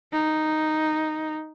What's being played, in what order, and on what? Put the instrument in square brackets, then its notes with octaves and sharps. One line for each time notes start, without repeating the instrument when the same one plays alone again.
[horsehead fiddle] D#4